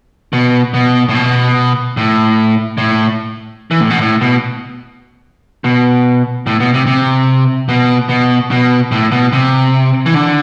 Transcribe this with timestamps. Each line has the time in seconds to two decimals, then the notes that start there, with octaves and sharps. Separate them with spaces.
0.33 B2
0.74 B2
1.09 A2
1.15 B2
1.97 A2
2.78 A2
3.71 E3
3.81 A2
3.90 B2
4.01 A2
4.21 B2
5.64 B2
6.47 A2
6.60 B2
6.74 C3
6.86 C3
7.69 B2
8.09 B2
8.51 B2
8.92 A2
9.12 B2
9.33 C3
10.06 E3
10.14 D3